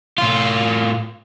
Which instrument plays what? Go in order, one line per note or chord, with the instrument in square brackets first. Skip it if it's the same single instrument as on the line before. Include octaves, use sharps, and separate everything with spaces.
[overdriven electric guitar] A2 F4